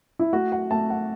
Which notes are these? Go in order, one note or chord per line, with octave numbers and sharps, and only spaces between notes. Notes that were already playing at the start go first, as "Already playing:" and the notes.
E4
A3 F#4
F#5
A3 A5
F#5